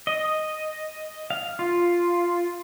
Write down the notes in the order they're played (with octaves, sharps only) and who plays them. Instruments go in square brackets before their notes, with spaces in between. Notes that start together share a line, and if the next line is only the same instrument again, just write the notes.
[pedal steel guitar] D#5
F5
F4